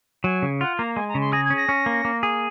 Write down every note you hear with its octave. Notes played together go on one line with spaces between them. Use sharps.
F#3 G#5
C#3
F4 F#5
A#3 A#5
G#3 G#5
A#5
C#3
C6
G#4 A#6
G#6
C#4
A#6
C#4
A#3
A#3
G#4